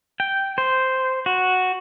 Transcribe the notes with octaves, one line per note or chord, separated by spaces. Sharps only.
G5
C5
F#4